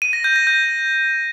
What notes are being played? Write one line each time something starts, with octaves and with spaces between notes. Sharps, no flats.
D#7
A#6
G6
A#6
G6